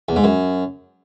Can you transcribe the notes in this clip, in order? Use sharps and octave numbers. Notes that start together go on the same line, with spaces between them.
E2
G#2
F#2